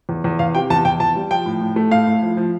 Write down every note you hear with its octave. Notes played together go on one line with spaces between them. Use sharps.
E2
E2
E2 F5
C3 G5
E2 A5
E2 G5
E2 A5
G3
F3 G5
A2
A2
A3
A2 F5
A2
F3
F3